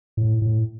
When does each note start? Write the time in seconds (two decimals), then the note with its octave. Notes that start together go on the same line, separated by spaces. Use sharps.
0.17 A2
0.42 A2